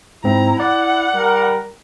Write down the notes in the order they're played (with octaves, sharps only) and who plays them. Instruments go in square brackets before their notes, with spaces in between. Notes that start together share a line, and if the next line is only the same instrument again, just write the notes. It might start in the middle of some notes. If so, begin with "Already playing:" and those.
[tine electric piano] G#2 C4 [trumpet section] E4 [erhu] A#5
[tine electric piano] D5 [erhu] F#5
[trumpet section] G3 A#4